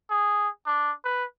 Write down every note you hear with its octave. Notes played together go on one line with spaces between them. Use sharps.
G#4
D4
B4